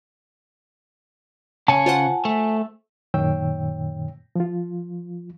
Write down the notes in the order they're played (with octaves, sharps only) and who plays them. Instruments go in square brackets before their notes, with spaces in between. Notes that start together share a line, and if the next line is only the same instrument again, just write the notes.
[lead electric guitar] C#3 C#5 [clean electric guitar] G#5 A5
[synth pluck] F4 C5 F#5
[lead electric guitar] A3
[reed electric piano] F#2 A#2 D#3 C#5 G5 E6
F3 F4